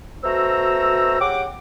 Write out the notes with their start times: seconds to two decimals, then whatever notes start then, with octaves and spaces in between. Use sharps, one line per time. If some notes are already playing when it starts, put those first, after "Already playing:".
0.24 B2 A3 F#4 C5 A#5 E6
1.20 C#3 G4 F#5 D6